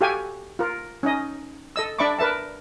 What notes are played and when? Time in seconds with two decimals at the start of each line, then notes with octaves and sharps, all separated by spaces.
0.01 F#4 G4 A4 F5 G5 G#5
0.59 F4 A#4
1.03 C#4 D#4 D#5
1.76 A4 D#5 E6
1.99 D4 D5 E5 B5 C#6 D6
2.19 A#4 B4 E5 A5